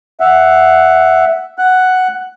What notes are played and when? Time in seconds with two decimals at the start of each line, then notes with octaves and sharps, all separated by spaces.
0.20 E5 F#5
1.58 F#5 F#6